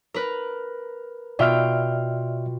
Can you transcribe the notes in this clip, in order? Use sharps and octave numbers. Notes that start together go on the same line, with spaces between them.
A#4 B4
B2 F4 D5 E5 G5 F6